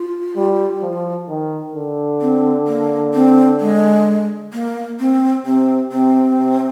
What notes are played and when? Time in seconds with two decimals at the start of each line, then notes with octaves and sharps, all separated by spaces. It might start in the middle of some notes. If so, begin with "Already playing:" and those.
Already playing: F4
0.36 G3
0.82 F3
1.28 D#3
1.75 D3
2.21 C4
2.67 A#3
3.14 C4
3.60 G#3
4.53 A#3
5.00 C4
5.46 C3 C4
5.92 C3 C4
6.39 C3